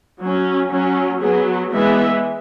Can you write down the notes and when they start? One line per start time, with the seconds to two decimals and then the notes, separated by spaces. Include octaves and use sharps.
0.20 F#3 C#4
0.71 F#3 C#4
1.21 F#3 B3 G#4
1.72 E3 G#3 B3 E5